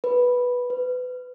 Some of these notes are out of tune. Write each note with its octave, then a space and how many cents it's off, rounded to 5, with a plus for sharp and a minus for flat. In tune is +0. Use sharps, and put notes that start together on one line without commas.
B4 -5
B4 +25